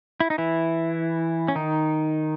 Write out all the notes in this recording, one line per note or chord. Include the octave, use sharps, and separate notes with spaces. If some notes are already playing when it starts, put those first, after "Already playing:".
E4
D#4
E3 E4
C#4
D#3 D#4